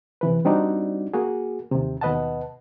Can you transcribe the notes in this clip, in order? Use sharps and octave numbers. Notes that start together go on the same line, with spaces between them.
C3 E3 B4
G3 C4 D4 D#4 F#4 D5
A#3 F#4 G#4
D#2 C3
D#2 B2 B4 D#5 F#5 A5